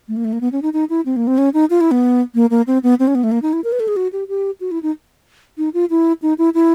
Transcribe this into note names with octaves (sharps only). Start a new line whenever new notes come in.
A3
A#3
A3
A#3
B3
C#4
D#4
D#4
E4
C4
A#3
C4
C#4
D#4
F4
E4
B3
A#3
A#3
C4
B3
C4
C#4
B3
A3
A#3
D#4
E4
A#4
B4
A4
G#4
F#4
G4
G4
F#4
E4
D#4
D#4
F4
E4
D#4
E4
E4